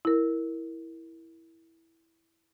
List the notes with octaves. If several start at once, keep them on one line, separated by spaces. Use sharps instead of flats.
E4 A#4